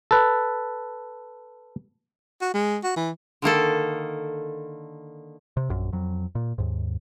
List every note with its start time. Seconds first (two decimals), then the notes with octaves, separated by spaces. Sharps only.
0.11 A4 B4
2.42 F#4
2.54 G#3
2.84 F#4
2.97 E3
3.42 D3 D#3 A#3 A4
5.57 C3
5.69 A#1 F#2
5.93 F2 F#3
6.35 A#2
6.58 D#2 G#2